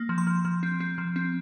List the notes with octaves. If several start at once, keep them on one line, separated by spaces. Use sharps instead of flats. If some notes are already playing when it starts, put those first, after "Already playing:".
Already playing: A#3
F3
C6
F3
F3
C4
C4
F3
C4